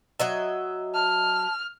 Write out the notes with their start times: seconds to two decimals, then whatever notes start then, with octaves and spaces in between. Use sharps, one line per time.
0.20 F#3 D#5 E5
0.94 A5 F6